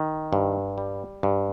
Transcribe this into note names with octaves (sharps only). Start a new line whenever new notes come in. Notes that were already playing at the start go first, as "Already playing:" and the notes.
Already playing: D#3
G2
G3
G2